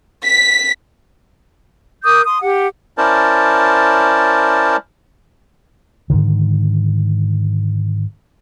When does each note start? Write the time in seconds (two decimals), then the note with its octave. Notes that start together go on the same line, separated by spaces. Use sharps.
0.24 B6
2.03 A#4 D6 D#6 G6
2.25 C6 D#6
2.41 G4 F#5
2.98 C#4 E4 A#4 C5 D5 A5
6.10 G#2 B2 D3 D#3